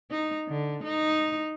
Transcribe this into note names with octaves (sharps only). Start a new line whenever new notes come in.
D#4
D3
D#4